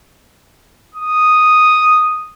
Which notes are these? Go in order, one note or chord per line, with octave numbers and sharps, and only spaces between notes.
D#6